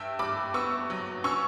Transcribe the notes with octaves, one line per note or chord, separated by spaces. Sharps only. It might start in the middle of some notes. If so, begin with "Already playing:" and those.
Already playing: G2 E5 G5
G2 B5 D6
B3 C#6 E6
F#3
C#4 C#6 E6